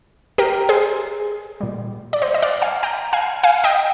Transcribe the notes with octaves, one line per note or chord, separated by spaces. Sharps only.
G4 A#4
G#4 C5
A#2 G3
D5
C5 D#5
D#5
D5 F5
F5 G#5
G5 A#5
F5 G#5
F5 G#5
D#5 G5